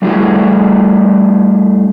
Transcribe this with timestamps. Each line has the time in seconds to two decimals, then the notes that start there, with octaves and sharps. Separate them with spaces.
0.02 G3 A3 D4 E4 F#4 G#4